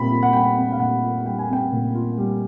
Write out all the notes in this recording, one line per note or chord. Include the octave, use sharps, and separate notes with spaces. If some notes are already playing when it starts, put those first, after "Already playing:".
Already playing: A#2 G3 C4 B5
F4
F#5
G3 G5
C4
F5
A#2 F#5
F4
G3 G5
G#5
C4 G5
A#2
F4
G3